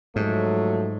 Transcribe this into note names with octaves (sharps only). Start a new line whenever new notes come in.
G#2 F3 F#3 A3